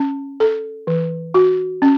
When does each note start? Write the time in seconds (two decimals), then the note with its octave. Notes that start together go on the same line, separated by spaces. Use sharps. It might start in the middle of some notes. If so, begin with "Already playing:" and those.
Already playing: C#4
0.40 A4
0.87 E3
1.34 F#4
1.82 C#4